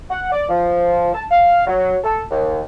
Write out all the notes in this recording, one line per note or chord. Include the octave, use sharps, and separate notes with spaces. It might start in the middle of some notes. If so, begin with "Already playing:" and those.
F#5
D5
F3
A5
F5
F#3
A4
D#2